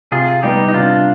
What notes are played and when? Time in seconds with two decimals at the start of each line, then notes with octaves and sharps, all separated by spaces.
0.12 C3 F4 G#4
0.43 G3 B3 D#4 G4
0.69 D#4
0.74 C3 D4 F4